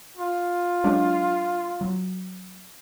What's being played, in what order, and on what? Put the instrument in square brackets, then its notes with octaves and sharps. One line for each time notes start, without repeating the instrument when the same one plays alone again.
[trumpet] F4
[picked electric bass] F#3 G#3 D4
F#3